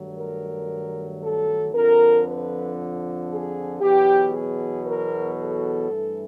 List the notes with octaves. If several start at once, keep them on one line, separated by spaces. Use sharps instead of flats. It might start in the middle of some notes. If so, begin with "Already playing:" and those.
Already playing: G2 D#3 F#3 A3
A#4
A4
F2 D3 F3 A#4
B4
G#4
E2 B2 F#3 G4
G#4
A#4
A4
G2 E3 A3